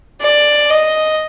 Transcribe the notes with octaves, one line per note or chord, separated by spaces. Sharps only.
D5
D#5